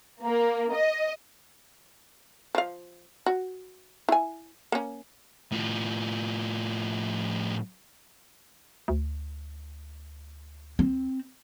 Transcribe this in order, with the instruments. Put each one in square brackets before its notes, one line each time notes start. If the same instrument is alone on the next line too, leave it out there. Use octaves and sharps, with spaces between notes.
[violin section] A#3
D#5
[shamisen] F3 F5
F#4
E4 G#5
A#3 C#4
[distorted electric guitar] A2 F3
[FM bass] D2
[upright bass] C4